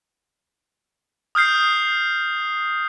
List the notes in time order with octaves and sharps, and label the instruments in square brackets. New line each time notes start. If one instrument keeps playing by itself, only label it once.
[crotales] D#6 F6 G6 C7